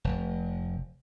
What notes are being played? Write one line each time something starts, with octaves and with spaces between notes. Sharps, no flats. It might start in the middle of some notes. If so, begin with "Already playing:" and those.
F1